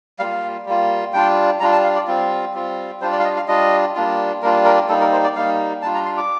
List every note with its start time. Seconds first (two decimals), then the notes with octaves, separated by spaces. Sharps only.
0.19 G3 A#3 F4 F5
0.66 G3 A#3 F4
1.13 G3 D4 F4 G5
1.60 G3 D4 F4 A#5
1.72 A5
1.84 F5
1.95 D5
2.07 G3 C4 F4
2.54 G3 C4 F4
3.00 G3 D4 F4 C5
3.12 D5
3.20 F5
3.24 D#5
3.36 F5
3.48 G3 D4 F4 D#5
3.95 G3 A#3 D4 F4
4.42 G3 A#3 D4 F4 A#4
4.65 A#4
4.88 G3 A#3 D#4 A4
5.00 A#4
5.12 C5
5.24 D5
5.36 G3 A#3 D#4 F5
5.82 G3 D4 F4 A5
5.95 A#5
6.06 C6
6.17 D6